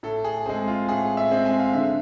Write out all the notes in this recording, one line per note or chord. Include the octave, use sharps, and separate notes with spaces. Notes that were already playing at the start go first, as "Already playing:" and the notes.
A2 A4
G#4
G#3 C4 G#4
F4
A2 G#4
E5
G#3 C4
G#5
F5
D3 E5